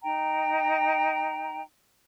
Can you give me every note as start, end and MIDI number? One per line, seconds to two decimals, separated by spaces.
0.02 1.61 63
0.02 1.61 79
0.02 1.61 82